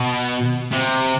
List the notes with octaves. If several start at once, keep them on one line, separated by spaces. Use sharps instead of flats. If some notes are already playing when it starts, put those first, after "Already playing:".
Already playing: B2
C3